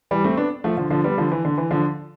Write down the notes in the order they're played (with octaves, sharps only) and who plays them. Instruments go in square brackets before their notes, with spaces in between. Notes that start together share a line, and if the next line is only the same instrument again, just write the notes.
[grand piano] E3 G3
A3 C4
B3 D4
F3 A3
D3 F3
D3 F3
G3 B3
D3 F3
E3
D3
E3
D3 F3